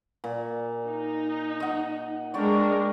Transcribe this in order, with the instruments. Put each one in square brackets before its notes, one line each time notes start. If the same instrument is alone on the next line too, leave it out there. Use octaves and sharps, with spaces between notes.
[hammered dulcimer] A#2
[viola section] D#4
[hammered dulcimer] D#5 F#5
[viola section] G#3 D4 A#4 [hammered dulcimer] C#5 D5 G5